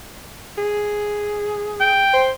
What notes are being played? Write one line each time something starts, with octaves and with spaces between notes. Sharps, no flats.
G#4
G5
C5